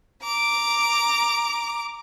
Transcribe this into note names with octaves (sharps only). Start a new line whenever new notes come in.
A#5 D6